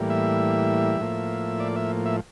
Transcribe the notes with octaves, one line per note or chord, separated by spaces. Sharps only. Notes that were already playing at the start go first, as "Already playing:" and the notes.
Already playing: A2 E3 G3 A#3
E5
A2 F3 A#3
D5
E5
E5